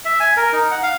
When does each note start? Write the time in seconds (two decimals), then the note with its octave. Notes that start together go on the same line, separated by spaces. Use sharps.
0.05 E5
0.20 G#5
0.37 A#4
0.53 D#4
0.71 F#5
0.83 F5